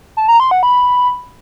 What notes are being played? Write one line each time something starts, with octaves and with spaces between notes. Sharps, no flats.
A5
A#5
C6
F#5
B5